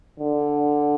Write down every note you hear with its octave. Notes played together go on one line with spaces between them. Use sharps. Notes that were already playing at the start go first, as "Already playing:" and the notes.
D3